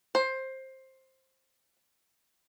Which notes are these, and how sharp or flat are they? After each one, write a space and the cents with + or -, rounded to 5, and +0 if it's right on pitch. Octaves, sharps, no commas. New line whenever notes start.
C5 +15